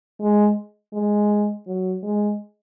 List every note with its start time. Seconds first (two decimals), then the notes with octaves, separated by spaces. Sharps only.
0.21 G#3
0.93 G#3
1.67 F#3
2.03 G#3